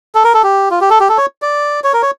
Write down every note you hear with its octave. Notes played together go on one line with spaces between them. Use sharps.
A4
A#4
A4
G4
F4
G4
A4
G4
A4
C#5
D5
C#5
A#4
C#5